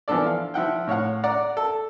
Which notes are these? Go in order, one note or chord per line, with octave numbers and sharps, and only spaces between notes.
E3 F3 B3 D4 A4 D5
F5
F3 E4 F#5 G5
A2 C#5 F5 F#5
D5 F#5 A#5
A4